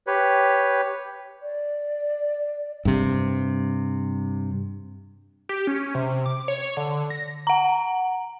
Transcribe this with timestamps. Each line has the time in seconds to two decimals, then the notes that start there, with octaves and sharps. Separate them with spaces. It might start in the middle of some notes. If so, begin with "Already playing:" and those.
0.07 G4 B4 C#5
1.41 D5
2.85 G2 C3
5.49 G4
5.67 C#4
5.95 C3
6.26 D6
6.48 C#5
6.77 D3
7.10 A#6
7.47 F#5 A#5